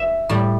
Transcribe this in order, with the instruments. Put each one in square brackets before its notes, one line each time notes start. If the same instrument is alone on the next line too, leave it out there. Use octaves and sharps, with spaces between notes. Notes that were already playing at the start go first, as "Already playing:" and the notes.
Already playing: [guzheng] E5
A2 G3